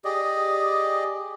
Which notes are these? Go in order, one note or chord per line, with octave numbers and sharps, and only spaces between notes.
G4 G#4 D5 D#5